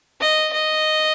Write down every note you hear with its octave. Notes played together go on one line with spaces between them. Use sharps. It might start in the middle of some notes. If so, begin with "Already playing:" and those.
D#5
D#5